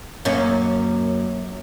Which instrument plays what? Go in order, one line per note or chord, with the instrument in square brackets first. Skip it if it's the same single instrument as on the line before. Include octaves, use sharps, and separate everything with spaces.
[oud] F#2 A#3 C#4